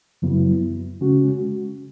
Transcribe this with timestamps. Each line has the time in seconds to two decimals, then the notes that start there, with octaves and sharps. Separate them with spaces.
0.22 F#2 C#3 F#3 B3 E4
1.01 C#3 G#3 C#4 F#4